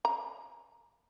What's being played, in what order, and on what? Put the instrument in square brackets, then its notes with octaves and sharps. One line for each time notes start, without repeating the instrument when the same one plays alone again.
[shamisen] A#5